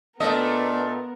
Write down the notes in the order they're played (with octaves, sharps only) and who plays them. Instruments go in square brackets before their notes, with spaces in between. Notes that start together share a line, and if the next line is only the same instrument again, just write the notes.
[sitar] A#2 A3 D#5 [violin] B3 A#4 [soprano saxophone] D4